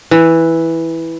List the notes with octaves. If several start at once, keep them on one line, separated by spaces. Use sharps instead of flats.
E3